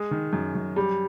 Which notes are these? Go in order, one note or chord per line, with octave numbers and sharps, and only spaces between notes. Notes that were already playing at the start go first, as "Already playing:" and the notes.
Already playing: G#3
D#3
F#2
F#2
G3